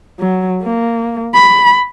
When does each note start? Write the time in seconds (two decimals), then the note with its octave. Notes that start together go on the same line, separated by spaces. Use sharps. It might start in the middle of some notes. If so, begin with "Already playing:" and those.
0.19 F#3
0.63 A#3
1.34 B5